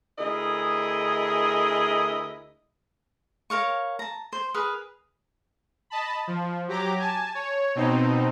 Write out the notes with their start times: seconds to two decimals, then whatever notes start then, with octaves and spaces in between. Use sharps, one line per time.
0.18 D2 E4 G#4 A#4 D#5
3.50 A#4 C#5 F5 C#6
3.99 A5 A#5
4.33 C5
4.54 G#4 A#4 B4
5.90 D#5 A5 B5
6.27 F3
6.68 F#3 G4 A#5 D6
6.99 G#5 A5
7.35 C#5
7.75 B2 C4 D#4